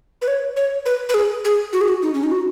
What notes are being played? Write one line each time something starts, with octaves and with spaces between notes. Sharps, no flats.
B4
C#5
C#5
B4
B4
G#4
G#4
F#4
G#4
F#4
D#4
C#4
D#4
F#4